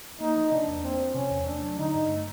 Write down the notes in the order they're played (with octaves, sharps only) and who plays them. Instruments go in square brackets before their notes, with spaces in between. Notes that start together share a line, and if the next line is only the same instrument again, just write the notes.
[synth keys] A#3 [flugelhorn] D#4
[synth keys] F3
[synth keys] C3 [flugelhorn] D4
[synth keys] E2
[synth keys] A#3 [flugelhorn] C4
[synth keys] F3
[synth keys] C3 [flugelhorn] C#4
[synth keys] E2
[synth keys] A3 [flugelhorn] D4
[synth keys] F#3
[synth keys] D3 [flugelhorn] D#4
[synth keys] G2
A3